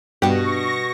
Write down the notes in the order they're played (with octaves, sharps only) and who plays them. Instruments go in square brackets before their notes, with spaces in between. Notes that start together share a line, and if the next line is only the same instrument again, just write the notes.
[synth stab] G2 [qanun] B2 F#5 [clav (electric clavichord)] G4 [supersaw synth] C#6 A#6